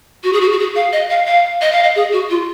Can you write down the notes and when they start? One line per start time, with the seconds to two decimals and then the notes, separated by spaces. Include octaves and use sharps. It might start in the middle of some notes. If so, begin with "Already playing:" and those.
0.24 F#4
0.33 G#4
0.41 F#4
0.52 F#4
0.59 G#4
0.76 F5
0.93 D#5
1.10 F5
1.27 F5
1.61 D#5
1.72 F5
1.83 D#5
1.96 G#4
2.13 F#4
2.30 F4